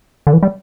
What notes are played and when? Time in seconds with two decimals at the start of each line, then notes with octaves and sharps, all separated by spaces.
0.27 D3
0.33 E3
0.43 G3